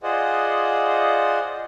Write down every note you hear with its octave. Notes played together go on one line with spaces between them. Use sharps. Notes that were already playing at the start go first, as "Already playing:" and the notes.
F4 G#4 C5 D5 D#5 F#5